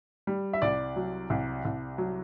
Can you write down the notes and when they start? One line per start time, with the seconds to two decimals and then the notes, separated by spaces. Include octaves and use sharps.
0.27 G3
0.53 E5
0.62 C2 D5
0.96 F#3
1.30 C2
1.65 C2
1.98 F#3